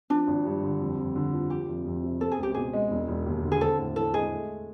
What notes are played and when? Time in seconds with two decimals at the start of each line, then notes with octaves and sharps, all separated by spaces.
0.10 F3 D4
0.27 G#1
0.45 G2
0.63 D3
0.80 F2
0.98 F2
1.16 D3
1.33 F3
1.50 F3 G4
1.68 F1
1.86 F2
2.03 C3
2.20 C4 A4
2.32 G#4
2.38 C#2 G4
2.54 B2 G#4
2.73 G#3
2.91 E1
3.08 E1
3.26 D#2
3.43 D3
3.52 G#4
3.61 C4 A4
3.78 A2
3.96 E3 A4
4.14 G#3 G#4
4.32 A3